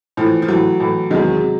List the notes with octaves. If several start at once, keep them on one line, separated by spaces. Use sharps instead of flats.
A2 E3 F3
F3
A2 E3 F#3
A2 E3
E2 C3 D#3 F#3 G#3
C3